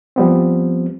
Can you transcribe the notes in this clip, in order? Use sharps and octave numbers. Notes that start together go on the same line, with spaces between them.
F3 G3 B3 C4